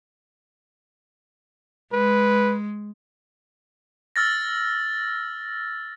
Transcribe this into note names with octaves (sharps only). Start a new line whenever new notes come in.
G#3 B4
E6 F6 A6 A#6